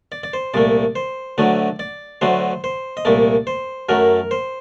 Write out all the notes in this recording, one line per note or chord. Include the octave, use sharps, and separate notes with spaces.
D5
D5
C5
C2 A#2 A3 D5
C5
D2 D3 F#3 A3 D5
D5
D2 D3 F#3 A3 C5
C5
D#5
C2 A#2 A3 D5
C5
F#2 F#3 A3 A#4
C5